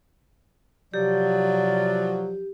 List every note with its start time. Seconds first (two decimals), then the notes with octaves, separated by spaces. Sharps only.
0.94 C3 F3 F#3 G4 D5